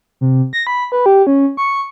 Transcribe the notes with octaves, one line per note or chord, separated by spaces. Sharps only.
C3
A#6
B5
B4
G4
C#4
C#6